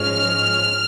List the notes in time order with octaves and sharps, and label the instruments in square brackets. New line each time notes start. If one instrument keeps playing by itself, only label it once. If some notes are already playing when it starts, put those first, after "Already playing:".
Already playing: [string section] G#2 F3 G#3 C#4 F6